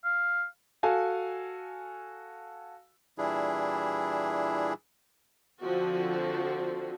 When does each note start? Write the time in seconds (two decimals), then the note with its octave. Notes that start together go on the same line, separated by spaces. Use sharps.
0.04 F5
0.83 F#4 A4 F5 G#5
3.18 A#2 E3 G3 D4 E4 G#4
5.61 D3 F3 C4 F#4